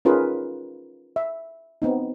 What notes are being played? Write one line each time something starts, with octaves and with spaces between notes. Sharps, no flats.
C#4 D#4 F4 G#4 A#4 B4
E5
B3 C4 D#4